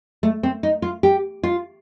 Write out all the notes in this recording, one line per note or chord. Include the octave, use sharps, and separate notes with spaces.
A3
C4
D#4
F4
G4
F4